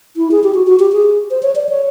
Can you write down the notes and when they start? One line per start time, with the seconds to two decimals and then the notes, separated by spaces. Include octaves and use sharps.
0.17 E4
0.31 G#4
0.44 G4
0.54 F#4
0.67 F#4
0.80 G4
0.92 G#4
1.31 C5
1.43 C#5
1.55 D5
1.69 C#5